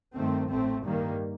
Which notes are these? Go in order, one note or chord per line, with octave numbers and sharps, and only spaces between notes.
G2 D#3 A3 C4
A1 A2 A3 C4
G2 D#3 G3 A#3